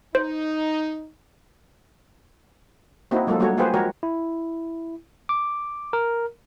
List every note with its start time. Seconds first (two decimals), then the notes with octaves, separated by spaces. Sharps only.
0.15 D#4 C5
3.11 A#3 C4 D#4 E4 F#4
3.27 F#3 G#3 A#3 F4 A4
3.40 G3 A3 A#3 D4 F#4 C#5
3.57 A#3 F4 G4 G#4 B4 C5
3.74 F3 G#3 F#4 G4 A#4 C#5
4.03 E4
5.29 D6
5.93 A#4